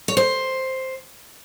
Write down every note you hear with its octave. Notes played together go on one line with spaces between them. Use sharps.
C#5
C5